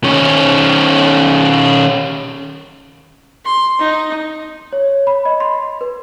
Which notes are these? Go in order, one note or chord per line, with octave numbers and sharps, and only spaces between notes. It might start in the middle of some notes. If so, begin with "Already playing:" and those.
D#3 C#4
C6
D#4
C#5
B5
D#5
C6
B4